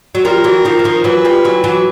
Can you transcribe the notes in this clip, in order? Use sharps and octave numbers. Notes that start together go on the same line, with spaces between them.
F#3
F3 G3 A#4
E3 F#3
D#3 F3
E3
D#3 F3
E3 F#3 B4
F3 G3
E3 F#3
E3 F#3